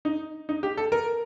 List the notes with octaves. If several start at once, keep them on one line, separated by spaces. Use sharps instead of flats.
D#4
D#4
G4
A4
A#4